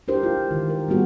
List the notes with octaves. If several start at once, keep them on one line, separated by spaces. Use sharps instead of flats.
D4 E4 G4 A#4 C5
F4
G#3
D#3 E3
A#4
G3 A#3 B3 F#4 G#4